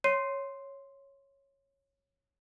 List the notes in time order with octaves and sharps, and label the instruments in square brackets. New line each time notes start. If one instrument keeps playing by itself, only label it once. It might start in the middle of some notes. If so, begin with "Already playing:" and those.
[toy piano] C#5 [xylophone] C6 C7 D#7